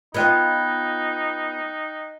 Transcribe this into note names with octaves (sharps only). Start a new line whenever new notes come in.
B3 D#4 F4 D#5 G5 F#6 G#6